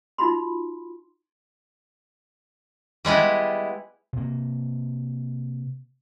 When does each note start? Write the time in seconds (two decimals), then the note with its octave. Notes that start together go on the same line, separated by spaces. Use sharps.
0.18 D#4 F4 F#4 B5 C6
3.05 G3 G#3 B3 E4
4.13 C3 A#3